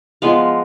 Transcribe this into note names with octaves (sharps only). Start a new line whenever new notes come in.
F3 G#3 B3 F5